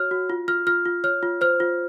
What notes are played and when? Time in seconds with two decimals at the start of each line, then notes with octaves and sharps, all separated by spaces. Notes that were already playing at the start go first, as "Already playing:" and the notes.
Already playing: F#4 C#5 F6
0.11 F#4
0.30 F4
0.48 F4 F6
0.67 F4 F6
0.85 F4
1.04 C#5 F6
1.23 F4
1.41 C5 F6
1.60 F4